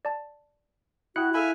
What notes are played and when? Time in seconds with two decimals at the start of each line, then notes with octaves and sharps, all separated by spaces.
0.05 D5 A5
1.16 E4 F#4 G5 D#6 F#6 C#7
1.34 G#4 A4 E5 F5 G#5 B5